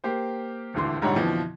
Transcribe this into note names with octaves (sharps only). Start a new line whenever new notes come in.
A#3 G4 C5
D#1 G#1 D2 D3 E3 C6
A#1 G#2 D3 G3 C#5 F#5
F2 B2 D3 E3 F3